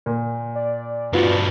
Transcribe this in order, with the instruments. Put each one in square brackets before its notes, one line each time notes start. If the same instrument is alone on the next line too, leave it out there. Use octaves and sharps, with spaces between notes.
[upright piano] A#2
[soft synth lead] D5
[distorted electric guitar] G2 F3 [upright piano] B3 F4 F#4